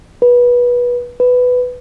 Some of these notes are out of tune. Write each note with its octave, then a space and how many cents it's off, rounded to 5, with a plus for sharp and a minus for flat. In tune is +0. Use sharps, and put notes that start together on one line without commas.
B4 -20
B4 +10